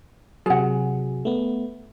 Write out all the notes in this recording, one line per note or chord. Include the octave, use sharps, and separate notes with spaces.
C3 F#3 G#4 F#5
A3 B3